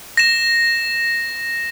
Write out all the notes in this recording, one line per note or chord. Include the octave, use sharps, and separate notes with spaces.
A#6 E7